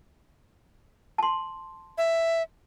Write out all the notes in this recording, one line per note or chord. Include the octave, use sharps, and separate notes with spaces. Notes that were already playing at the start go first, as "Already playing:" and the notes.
A5 C6
E5